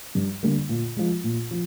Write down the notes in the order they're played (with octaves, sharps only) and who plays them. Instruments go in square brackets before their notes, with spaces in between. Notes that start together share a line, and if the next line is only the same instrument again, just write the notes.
[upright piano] G2
D3 G3 A#3
A#2
F3 G#3
A#2
F3